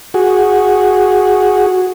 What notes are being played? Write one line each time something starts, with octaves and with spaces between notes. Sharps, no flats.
F#4 G#4